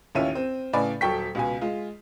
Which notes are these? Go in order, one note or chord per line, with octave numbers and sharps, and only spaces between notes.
A1 D#2 C#4 F4 E5 D#7
C4
A2 C#3 B4 D5 G#5 B5
D#1 F#3 A4 G5 C#6 B6
C#2 B2 G#5
G#3 F4